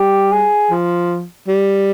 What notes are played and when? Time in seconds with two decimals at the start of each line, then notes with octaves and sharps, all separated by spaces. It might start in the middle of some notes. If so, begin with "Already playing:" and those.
Already playing: G3 G4
0.32 G#4
0.71 F3
1.47 G3